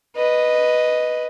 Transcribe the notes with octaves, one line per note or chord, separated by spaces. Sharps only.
B4 D#5